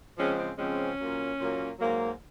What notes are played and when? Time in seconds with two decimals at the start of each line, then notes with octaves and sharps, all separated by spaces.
0.18 C#3 F3 G#3 C4 C#4
0.39 C4
0.58 C#3 F3 G#3 C4 C#4
0.99 A#2 F#3 A#3
1.38 A#2 F#3 A#3
1.79 G#2 F#3 A#3